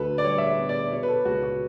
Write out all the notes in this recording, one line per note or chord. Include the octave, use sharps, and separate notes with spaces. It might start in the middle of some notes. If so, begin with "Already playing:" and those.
Already playing: D2 D3 A4 B4
D5
G3 C#5
E5
D5
B3
D5
B2 C#5
B4
A4
C#2 F#4
F#4